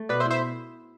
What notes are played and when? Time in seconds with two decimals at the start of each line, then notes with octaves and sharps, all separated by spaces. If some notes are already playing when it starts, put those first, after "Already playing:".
Already playing: A3
0.09 B2 B4 D5
0.20 C5 E5
0.25 E4
0.30 C5 E5